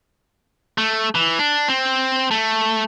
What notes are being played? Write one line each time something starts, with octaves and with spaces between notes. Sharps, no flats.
A3
E3
D4
C4
A3